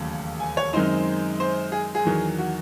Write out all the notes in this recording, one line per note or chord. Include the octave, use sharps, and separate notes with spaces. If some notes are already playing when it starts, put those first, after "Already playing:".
Already playing: E1 D#2 C#3 F#3 A3
G#5
C#5
F#2 D#3 G#3 C4 D#4 C5
C5
G#4
G#4
E2 D#3 F#3
F#4